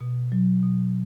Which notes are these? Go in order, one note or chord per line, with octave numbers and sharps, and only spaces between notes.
B2
F#3
B2